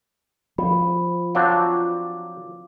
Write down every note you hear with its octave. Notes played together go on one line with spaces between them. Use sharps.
F3 B5
F#3 C4 D4 F5 D6